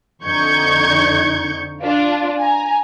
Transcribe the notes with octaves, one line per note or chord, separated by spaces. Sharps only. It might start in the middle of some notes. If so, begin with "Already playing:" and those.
F2 D3 D#4 C#6 G6 G#6
D4 F4
G#5 A#5